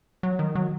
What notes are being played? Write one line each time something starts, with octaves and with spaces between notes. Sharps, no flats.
F#3
D#3
F#3